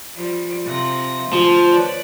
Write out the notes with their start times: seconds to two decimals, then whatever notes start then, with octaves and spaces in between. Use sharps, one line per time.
0.16 F3 G3
0.65 C3 F3 A#6
1.33 D2 F3
1.70 B4 C#5 D5